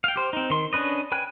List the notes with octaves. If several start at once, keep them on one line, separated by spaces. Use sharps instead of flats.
F5 G5
G4 C5
C4 D#4
D#3 C6
C#4 D4 B4 D#5
B4 G5 G#5 F#6